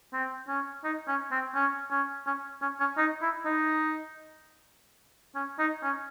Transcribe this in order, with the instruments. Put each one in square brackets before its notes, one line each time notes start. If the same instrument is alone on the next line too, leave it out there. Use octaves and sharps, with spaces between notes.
[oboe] C4
C#4
D#4
C#4
C4
C#4
C#4
C#4
C#4
C#4
D#4
E4
D#4
C#4
D#4
C#4